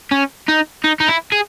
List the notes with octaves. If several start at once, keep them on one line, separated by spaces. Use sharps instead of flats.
C#4
D#4
D#4
D#4
E4
G#4